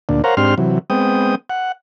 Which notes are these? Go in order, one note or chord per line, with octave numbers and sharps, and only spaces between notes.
D2 A#2 D4
A#4 C5 C#5 F5 F#5 A#5
G#2 C4 D4 G4 C6 F6
C3 E3 F#3
G#3 B3 C4 G5 D#6
F#5